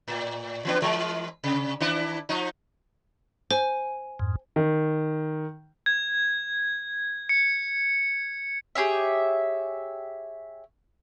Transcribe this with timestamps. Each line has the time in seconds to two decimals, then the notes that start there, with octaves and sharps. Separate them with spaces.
0.08 A2
0.65 E3 B3 D4
0.82 E3 G#3 A#4
1.44 C3
1.80 D#3 D4 E4
2.29 F3 D#4
3.51 C5 G#5
4.19 F2 G#2
4.56 D#3
5.86 G#6
7.29 C#7
8.75 G4 G#4 C#5 E5